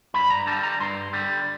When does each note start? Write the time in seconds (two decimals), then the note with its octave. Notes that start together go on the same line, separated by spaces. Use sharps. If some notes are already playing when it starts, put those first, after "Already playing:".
0.14 G2 B5
0.30 A#5
0.47 D3 G3 A5
0.63 A#5
0.80 G2 C6
1.13 D3 G3